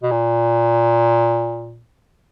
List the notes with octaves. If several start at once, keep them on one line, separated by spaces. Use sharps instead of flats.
B2
A#2